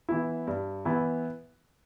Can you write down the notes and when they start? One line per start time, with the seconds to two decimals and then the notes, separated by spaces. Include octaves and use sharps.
0.09 E3 B3 E4
0.47 G2
0.85 E3 B3 E4